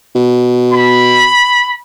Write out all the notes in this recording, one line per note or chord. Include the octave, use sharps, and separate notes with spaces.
B2
B5